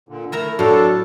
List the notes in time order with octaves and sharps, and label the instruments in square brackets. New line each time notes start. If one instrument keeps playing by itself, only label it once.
[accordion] A#2 D3
[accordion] A3 [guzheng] E4 A#4 A#5
[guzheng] A2 F5 [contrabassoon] F#3 [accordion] D4 A4